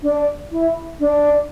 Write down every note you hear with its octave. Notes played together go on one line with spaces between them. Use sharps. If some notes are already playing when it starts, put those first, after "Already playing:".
D4
E4
D4